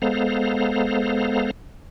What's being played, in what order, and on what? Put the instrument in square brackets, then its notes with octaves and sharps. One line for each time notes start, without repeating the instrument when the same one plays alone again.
[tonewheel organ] G#3 B3 A4 C5 F5 A#5